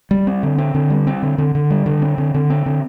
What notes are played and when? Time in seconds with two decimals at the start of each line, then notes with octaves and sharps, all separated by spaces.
0.11 G3
0.27 C4
0.43 D3
0.58 C4
0.75 D3
0.90 G3
1.07 C4
1.23 D3
1.38 D3
1.55 D3
1.70 G3
1.86 D3
2.02 C4
2.18 D3
2.35 D3
2.50 C4
2.66 D3